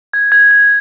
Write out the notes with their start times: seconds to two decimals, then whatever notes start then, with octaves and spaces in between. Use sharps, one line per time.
0.13 G#6
0.32 G#6
0.51 G#6